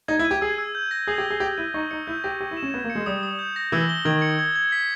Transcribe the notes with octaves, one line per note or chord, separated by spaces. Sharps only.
D#4 G#6
E4
D#7
G4
G#4 E6
E6
G6
A#6
G#4 D#6
G4
G7
G#4
G4 A#6
E4 D#7
D#4 C#6
D#4 C#7
E4 G6
G4 A#6
G4 E6
E4
E7
C#4
B3 G#6
A#3
C#7
G#3
G3 D#6
D#6
G6
A#6
E3 E6
G7
D#3 G#6
C#7
G#6
G#6
B6